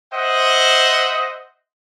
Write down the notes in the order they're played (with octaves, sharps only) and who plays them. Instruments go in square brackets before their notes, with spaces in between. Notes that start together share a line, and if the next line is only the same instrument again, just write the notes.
[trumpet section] C5 D#5 E5 F#5